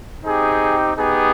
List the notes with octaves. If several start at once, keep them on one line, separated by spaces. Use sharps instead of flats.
C4 D#4 G4 G#4
B3 D#4 G4 G#4